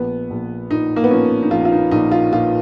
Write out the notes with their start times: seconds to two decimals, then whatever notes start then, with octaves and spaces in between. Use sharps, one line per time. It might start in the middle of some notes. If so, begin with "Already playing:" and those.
Already playing: A#1 B3
0.30 A#1
0.71 A#2 D#4
0.96 A#3
1.04 B3
1.11 F3 C#4
1.43 D#4
1.51 A#1 F4
1.65 F4
1.72 D#4
1.91 A#1 D#4
2.12 F4
2.32 A#2 F4